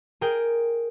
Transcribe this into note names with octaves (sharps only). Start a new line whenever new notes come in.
G#4 A#4 G5